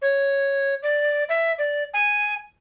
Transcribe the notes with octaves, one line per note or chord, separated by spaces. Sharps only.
C#5
D5
E5
D5
G#5